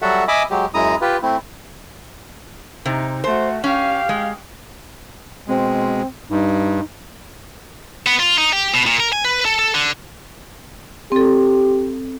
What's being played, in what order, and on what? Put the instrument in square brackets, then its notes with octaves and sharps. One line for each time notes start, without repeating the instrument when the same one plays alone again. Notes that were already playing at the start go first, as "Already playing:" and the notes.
[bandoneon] F#3 G3 F#4 A4 E5 F#5
D#5 E5 G#5 B5 D6 D#6
F#3 G#3 G4
F#2 G#3 E4 A#5 D#6
F4 G4 B4
A3 C4 E4
[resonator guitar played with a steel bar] C3 [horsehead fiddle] D#4
[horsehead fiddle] A3 F#4 [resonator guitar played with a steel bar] C5
[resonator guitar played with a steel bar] C#4 [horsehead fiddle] G4 F5
[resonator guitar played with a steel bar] G#3
[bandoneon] B2 G#3 [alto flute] C4
[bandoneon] G2 [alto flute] D#4
[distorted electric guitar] B3
F4
D#4
G4
B2
A#2
A#4
G#5
B4
A4
A4
D3
[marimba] C4 A4 [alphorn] G4